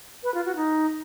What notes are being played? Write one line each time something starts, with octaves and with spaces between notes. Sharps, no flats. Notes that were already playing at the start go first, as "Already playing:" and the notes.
B4
F4
F#4
D#4